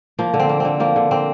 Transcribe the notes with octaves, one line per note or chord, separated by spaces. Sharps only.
F3 A#3
D3
C4
A#3
D3 C4
F3 A#3
D3
A#3 C4